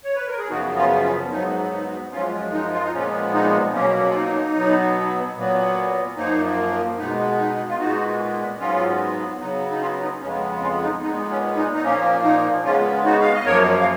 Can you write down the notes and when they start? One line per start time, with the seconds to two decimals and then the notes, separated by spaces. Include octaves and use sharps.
0.04 C#5
0.15 B4
0.27 A#4
0.38 G#4
0.50 F#2 C#3 F3 B3 D#4 F#4
0.77 C#4 F4
1.04 C#4
1.31 G#2 F#3 B3 D#4
1.72 D#4
2.12 F#2 F3 G#3 C#4 F4
2.53 D#4
2.72 F4
2.82 D#4
2.93 A#2 F3 G#3 B3 C#4
3.33 D#4
3.74 B2 F#3 A#3 C#4
4.10 F4
4.14 D#4
4.55 B2 F#3 B3
5.36 A#2 F#3 B3
6.17 F#2 F3 A#3 D#4
6.98 B2 G#3 B3 D#4
7.38 D#4
7.67 F4
7.79 A#2 G#3 B3 D#4 F#4
8.59 G#2 F#3 B3 C#4 F4
9.40 C#3 F#3 B3 D#4
9.71 D#4
9.81 C#4 F4
10.01 D#4
10.21 F2 C#3 G#3 B3 C#4
10.62 C#4 F4
10.82 D#4
11.02 A#2 G#3 B3 D#4
11.29 C#4
11.56 D#4
11.73 D#4
11.83 A#2 F3 A#3 C#4
12.24 D#4
12.64 C#3 G#3 B3 C#4 F4
13.05 D#4 F#4
13.21 F5
13.33 D#5
13.45 F#2 F3 A#3 A#4 C#5
13.81 F5